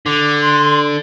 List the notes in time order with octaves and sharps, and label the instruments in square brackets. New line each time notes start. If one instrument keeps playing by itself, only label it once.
[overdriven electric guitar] D3 [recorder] D6
[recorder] C6